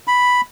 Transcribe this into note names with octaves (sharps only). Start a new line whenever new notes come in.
B5